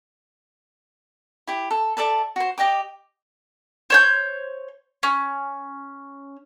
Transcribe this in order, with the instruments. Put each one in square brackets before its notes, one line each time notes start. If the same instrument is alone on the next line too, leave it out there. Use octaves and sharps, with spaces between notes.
[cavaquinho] E4 G4
A4
A4 D5 E5 A5
F#4 C5
G4 D#5 G5 D6
[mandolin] C5 C#5 G6
C#4